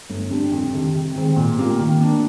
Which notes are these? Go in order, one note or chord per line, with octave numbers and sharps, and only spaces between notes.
G1
F2 D3 G3 D4
F2
C3 D#3 G3
C3
D#3 G#3 C4
A#2
G3 A#3 F4
D#3
A#3 D4